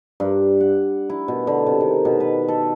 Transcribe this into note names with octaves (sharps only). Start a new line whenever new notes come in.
G2
F#5
E4
B2
D3
C3
D#3
B2
B4
A4